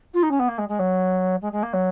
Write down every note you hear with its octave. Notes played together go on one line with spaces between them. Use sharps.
F4
D#4
C#4
B3
A#3
G#3
G#3
F#3
G#3
G#3
A#3
F#3